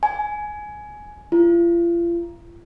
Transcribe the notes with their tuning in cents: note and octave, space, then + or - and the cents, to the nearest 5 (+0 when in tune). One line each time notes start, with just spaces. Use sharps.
G#5 +15
F4 -40